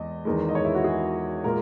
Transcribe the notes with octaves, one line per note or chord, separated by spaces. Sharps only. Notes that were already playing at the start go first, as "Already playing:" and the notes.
Already playing: E2 G#3 D#5
E2 D#3 G#3
D#5
C#5
E4
F#4
G#4
A#2 G#3 A#4